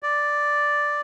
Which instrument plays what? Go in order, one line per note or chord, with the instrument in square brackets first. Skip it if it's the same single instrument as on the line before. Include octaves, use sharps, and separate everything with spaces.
[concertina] D5